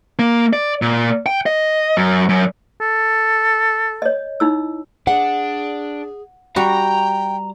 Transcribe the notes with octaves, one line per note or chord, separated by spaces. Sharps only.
A#3
D5
A#2
G5
D#5
F#2
F#2
A4
C#5 D#5
D#4 E4 E6
D4 G#4 F#5
G3 F#4 G5 A#5